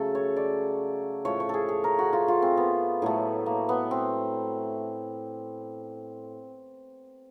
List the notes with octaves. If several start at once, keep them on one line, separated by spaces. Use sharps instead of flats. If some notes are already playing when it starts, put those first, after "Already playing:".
Already playing: C#3 F#3 A3 A4
C#5
D5
A2 F3 A3 C#5
C#5
G#4 A4
G#4
A#4
F#4
F4
F4
C4
B3
A2 F#3 A3
A#3
B3
C4